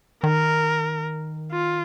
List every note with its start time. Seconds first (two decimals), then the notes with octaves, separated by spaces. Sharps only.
0.24 D#3 A#4
1.52 F4